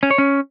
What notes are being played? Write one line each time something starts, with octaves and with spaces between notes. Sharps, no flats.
C#4
C#5
C#4